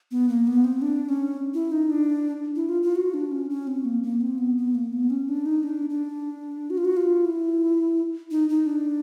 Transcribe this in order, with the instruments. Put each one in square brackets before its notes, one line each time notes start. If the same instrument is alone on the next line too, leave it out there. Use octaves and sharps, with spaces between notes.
[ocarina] B3
A#3
B3
C4
D4
C#4
E4
D#4
D4
E4
F4
F4
F#4
D4
C#4
C#4
C4
A#3
A#3
C4
B3
B3
A#3
B3
C#4
D4
D#4
D4
D4
F#4
F4
F#4
F4
E4
D#4
D#4
D4